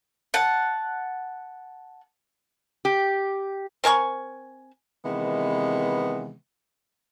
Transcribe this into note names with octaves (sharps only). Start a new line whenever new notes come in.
F#5 A5
G4
C4 A#4 G#5 C#6
C3 D#3 E3 G#3 B3